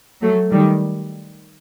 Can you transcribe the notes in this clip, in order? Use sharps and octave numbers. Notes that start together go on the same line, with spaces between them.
F#3 A3
D#3 G3